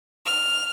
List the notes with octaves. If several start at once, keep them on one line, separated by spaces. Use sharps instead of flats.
F6